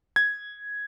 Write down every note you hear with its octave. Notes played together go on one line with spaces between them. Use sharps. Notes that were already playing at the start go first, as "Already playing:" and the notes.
G#6